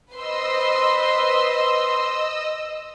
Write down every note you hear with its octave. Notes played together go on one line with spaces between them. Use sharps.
B4 C5 D#5 C6 E6